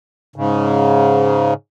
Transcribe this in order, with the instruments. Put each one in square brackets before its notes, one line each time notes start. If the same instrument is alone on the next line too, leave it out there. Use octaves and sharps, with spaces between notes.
[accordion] G#2 C#3